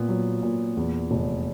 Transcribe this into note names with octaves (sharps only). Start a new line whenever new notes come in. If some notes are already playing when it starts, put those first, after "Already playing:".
Already playing: A#2 B3
F#3
A#2
E2
F1